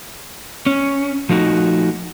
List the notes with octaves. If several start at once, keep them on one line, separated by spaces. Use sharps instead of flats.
C#4
F3 A3 D#4 F#4